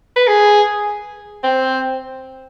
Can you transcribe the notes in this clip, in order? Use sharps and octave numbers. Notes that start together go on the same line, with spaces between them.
B4
G#4
C4